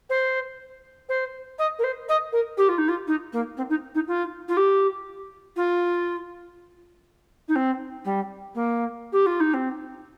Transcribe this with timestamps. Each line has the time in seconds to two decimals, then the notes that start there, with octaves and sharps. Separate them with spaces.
0.10 C5
1.09 C5
1.58 D#5
1.79 A#4
1.83 C5
2.09 D#5
2.32 A#4
2.57 G4
2.68 F4
2.78 D#4
2.88 F4
3.07 D#4
3.33 A#3
3.57 C4
3.69 D#4
3.95 D#4
4.07 F4
4.48 F4
4.57 G4
5.56 F4
7.48 D#4
7.55 C4
8.05 G3
8.55 A#3
9.12 G4
9.26 F4
9.40 D#4
9.54 C4